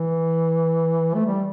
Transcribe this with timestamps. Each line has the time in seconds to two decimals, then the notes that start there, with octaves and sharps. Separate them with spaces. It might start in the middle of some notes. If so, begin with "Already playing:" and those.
Already playing: E3
1.15 A3
1.26 G3